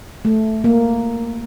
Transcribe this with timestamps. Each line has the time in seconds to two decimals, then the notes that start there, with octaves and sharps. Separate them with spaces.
0.25 A3
0.64 A#3